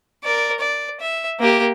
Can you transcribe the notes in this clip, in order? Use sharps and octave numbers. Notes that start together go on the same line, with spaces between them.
A#4 D5
D5
E5
A#3 G4